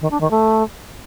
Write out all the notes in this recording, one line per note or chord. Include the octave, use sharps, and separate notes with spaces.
D#3
D4
D#3
A3